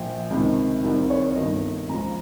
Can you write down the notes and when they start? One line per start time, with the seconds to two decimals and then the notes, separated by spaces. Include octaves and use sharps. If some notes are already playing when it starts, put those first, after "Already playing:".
Already playing: A#1 A#2 F3 G5
0.30 C#2 C3 D#3
0.83 C2 C3 D#3
1.10 C#5
1.36 G1 G2 D#3 D#5
1.89 C#2 C#3 F3 A#5